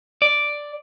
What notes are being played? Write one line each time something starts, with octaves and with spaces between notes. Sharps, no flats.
D5